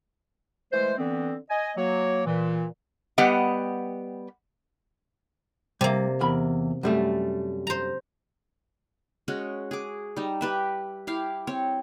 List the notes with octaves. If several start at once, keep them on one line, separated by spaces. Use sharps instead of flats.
E3 G#3 A3 C5
D3 E3 B3 C4
D#5 G#5
F#3 A#3 C#5
A#2 E3
G3 B3 G4 D#5 F#5
C3 G3 A#3
E2 A#4 B5
F#2 G3 A3
C5 A#5
G#3 C#4 F#4
G#4 D6
G3 D#4
G4 B4 E5
E4 G4 F5
C4 C#5